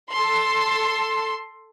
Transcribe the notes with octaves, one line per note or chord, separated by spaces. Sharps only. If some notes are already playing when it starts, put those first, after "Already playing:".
A4 C6